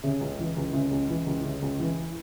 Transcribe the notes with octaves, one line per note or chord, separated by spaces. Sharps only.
C#3
C#2
E3
C#2
C#3
C#2
E3
C#2
C#3
C#2
E3